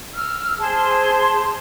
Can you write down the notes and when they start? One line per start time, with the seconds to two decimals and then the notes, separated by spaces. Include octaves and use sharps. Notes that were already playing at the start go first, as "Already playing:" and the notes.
0.14 E6 F6
0.59 G#4 C5 A5 C6